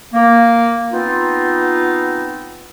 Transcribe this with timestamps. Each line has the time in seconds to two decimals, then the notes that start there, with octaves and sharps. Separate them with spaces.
0.14 A#3
0.92 B3 C4 D#4 F4